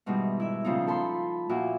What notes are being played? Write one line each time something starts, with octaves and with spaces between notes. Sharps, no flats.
G#2 B2 D#3 E3 G3
E4 E5
A#2 C#3 F3 B3 D#4
A4 A5 B5 C6
A#2 F3 E4 F#4